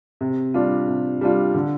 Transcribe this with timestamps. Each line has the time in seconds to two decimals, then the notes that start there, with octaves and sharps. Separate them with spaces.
0.21 C3
0.54 G3 D4 F4
0.88 C3
1.21 G3 D4 F4
1.54 D3